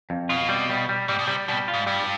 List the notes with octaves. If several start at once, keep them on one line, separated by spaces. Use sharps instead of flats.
F2
B2 F4
G3
G3
G3
G#2 G3
B2
C3 G3
B2 G3
F4
G#2
G2 G3